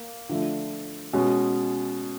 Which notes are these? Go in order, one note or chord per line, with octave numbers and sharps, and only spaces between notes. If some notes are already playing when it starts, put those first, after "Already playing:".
Already playing: A#3
D3 F3 A3
B2 G#3 C#4